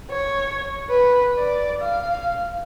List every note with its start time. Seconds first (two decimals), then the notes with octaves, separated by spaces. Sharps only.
0.10 C#5
0.89 B4
1.38 D5
1.81 F5